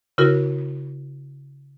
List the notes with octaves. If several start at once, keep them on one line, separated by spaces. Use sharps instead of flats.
C#3 E4 F#4 A#4